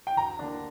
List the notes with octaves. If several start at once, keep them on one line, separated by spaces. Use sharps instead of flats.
G5
D2 A#5
D3 A#3 D4